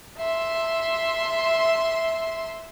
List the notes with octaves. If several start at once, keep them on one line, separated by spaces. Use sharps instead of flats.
E5 C6